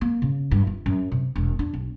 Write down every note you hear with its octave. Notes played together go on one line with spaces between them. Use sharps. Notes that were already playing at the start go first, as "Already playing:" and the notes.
A#3
C#3
G2
F4
F#2
C3
E1
D4
B1